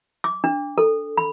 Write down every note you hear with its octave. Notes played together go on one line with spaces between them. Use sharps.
D6
D4
A4
B5